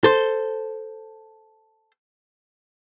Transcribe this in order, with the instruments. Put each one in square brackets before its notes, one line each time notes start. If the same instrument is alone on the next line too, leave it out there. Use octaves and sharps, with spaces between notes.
[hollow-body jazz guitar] A4 C5